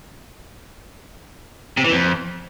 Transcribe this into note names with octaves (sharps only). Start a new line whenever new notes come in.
C3
E3
F2